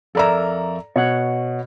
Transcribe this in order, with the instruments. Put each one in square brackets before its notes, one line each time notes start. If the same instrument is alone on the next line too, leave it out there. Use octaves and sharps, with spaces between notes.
[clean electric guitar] F2 A#4 E5 [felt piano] A4 D5 A#5
[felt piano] B2 [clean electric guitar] C#5 F#5